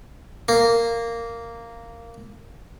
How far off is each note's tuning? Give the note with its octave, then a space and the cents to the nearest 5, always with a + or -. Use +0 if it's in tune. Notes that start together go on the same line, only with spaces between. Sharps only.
A#3 -10